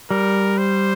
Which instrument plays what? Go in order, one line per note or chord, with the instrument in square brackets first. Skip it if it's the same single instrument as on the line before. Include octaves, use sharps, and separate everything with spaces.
[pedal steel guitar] G3 [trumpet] A#4
[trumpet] C5